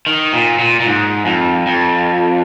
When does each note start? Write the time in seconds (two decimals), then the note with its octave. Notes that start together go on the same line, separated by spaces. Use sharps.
0.07 D#3
0.33 A#2
0.59 A#2
0.80 A#2
0.86 G#2
1.26 F2
1.67 F2